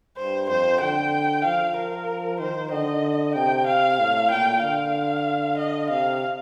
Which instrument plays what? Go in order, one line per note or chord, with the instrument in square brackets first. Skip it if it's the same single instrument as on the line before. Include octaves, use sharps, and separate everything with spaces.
[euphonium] G2 [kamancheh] C5
[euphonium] F2 [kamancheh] C5
[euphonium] D3 [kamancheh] G5
[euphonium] F3 [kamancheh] F5
[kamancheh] A#4
[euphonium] D#3 [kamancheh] C5
[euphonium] D3 [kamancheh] D#5
[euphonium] C3 [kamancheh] G5
[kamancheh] F5
[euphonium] A2
[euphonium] A#2 [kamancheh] G5
[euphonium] D3 [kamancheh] F5
[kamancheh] D#5
[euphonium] C3 [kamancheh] F5